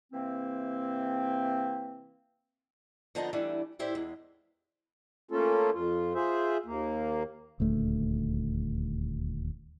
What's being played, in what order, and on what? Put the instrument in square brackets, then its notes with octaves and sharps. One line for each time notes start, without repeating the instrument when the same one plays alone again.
[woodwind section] C3 E3 A#3 C4
[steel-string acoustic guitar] D3 F3 B3 D#4 A5 A#5
E3 G3 A3 D4
A2 E4 G4 C5 D5 E5
E2 G#3
[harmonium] A3 A#3 C#4 F4 A4
F2 F4
F4 G#4 C5 E5
D#2 A#3
[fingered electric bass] D#1 D2 A3